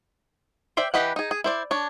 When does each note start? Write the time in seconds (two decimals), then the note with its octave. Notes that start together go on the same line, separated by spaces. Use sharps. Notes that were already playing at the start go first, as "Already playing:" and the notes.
0.77 C5 D5 E5 G5
0.94 E3 G4 B4 D#5 F#5
1.16 D#4 G#4
1.31 G#4
1.44 E4 C5 D5
1.71 D4 C#5